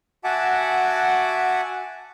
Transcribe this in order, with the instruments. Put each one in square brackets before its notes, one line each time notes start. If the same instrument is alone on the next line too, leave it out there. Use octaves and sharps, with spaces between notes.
[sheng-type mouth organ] F#4 E5 F#5 G#5 A5 D6